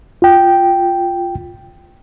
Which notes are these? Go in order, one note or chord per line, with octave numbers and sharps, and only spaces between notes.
F4 G5